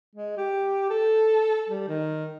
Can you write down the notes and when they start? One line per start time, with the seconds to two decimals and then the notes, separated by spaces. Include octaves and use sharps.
0.15 G#3
0.37 G4
0.90 A4
1.69 G3
1.88 D#3